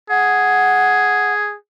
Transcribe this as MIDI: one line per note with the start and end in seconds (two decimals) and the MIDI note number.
0.10 1.55 68
0.10 1.33 78